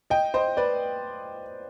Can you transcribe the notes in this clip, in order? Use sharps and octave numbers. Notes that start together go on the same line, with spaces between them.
D#5 G5
C5 D#5
B4 D5